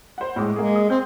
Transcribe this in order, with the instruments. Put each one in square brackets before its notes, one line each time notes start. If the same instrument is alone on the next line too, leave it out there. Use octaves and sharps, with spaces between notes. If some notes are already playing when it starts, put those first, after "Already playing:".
[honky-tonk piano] C5 F#5
A2 G#3 D6
[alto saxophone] G#3 [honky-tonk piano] A#3 G#4
[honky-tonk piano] D#6
[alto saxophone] C4 [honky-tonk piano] G6